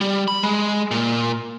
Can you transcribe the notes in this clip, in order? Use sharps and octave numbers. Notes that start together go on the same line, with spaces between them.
G3
B5
G#3
A#2